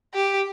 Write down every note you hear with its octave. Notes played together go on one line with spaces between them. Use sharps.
G4